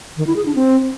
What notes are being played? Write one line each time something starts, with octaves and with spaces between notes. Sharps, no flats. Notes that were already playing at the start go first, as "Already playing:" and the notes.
D#3
E4
G#4
D4
C4